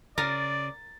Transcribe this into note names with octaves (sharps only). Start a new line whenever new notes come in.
C#3 A#4 D5 A6